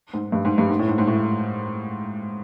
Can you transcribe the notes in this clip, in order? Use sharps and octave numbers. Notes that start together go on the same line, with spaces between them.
G#2
G2
G#2
G2
G#2
A2
G#2
G#2
A2